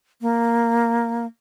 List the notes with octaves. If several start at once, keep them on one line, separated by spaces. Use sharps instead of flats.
A#3